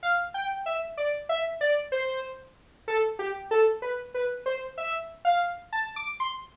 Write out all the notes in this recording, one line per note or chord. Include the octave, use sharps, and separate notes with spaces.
F5
G5
E5
D5
E5
D5
C5
A4
G4
A4
B4
B4
C5
E5
F5
A5
D6
C6